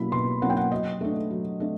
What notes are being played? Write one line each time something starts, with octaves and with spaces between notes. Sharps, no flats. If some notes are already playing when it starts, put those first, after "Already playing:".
Already playing: B2 F#3 A#3 C#4 E4 B5
B2 C6
F#3 A#3 C#4 E4 F#5
G5
F#5
F#3 D#5
A3 D4
F#3
A3 D4